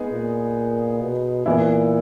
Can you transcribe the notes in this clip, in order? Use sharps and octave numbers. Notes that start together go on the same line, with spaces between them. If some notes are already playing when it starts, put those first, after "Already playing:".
Already playing: G#3 B3 D#4 G#4
A#2
B2
A#2 E3 B3 E4